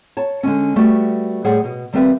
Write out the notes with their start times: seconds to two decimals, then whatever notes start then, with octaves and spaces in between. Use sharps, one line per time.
0.17 C#5 A5
0.43 D3 G#3 C#4
0.76 G3 A3 B3 F#4 G4
1.44 A2 G3 G#4 C5 C#5 F#5
1.64 B2
1.93 D#2 G3 C4 G4 B4 E5